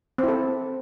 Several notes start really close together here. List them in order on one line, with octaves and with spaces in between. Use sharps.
C4 E4 A4